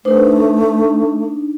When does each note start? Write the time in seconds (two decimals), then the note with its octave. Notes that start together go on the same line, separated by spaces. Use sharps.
0.05 A3 D4 D#4 B4 C5